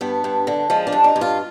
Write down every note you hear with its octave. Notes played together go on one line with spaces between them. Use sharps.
G2 B3
G2
D3
F3 G#3
D4
G2
D#4
G2
F4